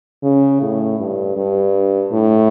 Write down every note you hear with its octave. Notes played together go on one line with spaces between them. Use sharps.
C#3
A2
G2
G2
A2